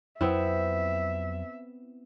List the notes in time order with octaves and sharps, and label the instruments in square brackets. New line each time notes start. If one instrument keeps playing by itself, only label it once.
[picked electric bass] F2 F#3 [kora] B3 C4 E4 [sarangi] E5